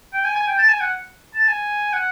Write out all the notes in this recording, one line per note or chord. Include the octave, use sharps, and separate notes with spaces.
G5
G#5
G#5
G5
A5
G#5
F#5
A5
G#5
F#5